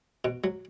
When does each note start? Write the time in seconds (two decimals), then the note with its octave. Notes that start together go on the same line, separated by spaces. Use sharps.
0.25 B2
0.44 F#3